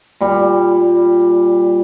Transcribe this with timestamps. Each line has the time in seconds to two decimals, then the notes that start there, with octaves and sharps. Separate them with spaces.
0.21 A#2 G3